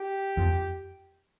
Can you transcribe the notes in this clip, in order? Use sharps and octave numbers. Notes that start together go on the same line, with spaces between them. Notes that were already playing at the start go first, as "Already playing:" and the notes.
Already playing: G4
F2 F3